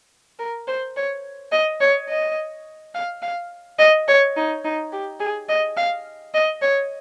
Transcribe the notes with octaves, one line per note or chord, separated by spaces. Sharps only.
A#4
C5
C#5
D#5
C#5
D#5
F5
F5
D#5
C#5
D#4
D#4
G4
G#4
D#5
F5
D#5
C#5